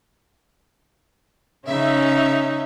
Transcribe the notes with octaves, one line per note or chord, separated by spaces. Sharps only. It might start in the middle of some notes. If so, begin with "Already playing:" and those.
C#3 C#4 D#4 E5